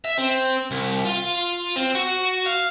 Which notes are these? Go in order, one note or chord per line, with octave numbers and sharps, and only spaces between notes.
E5
C4
C2
F4
C4
F#4
F5